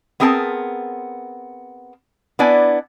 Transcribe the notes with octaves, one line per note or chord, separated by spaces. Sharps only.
B3 C4 G#4 A#4 G5 A5
B3 D4 E4 D5 G#5